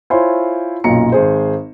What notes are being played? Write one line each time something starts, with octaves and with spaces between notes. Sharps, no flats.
E4 F4 C5 C#5 G#5 C6
B1 F#2 A#2 F4 A#5 C#7
G#1 G#4 C5